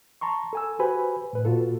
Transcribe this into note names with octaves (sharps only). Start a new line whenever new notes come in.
A5 A#5 C6 C#6
A4 G#5 E6
F#4 G4 B4 C5 G#5 B5
A2 B4
A#2 F4 F#4 A4